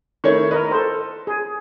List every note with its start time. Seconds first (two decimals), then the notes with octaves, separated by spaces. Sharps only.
0.24 D#3 A3 E4 C#5 C#6
0.51 A#4 B4 D#5
0.71 A4 C5
1.27 G#4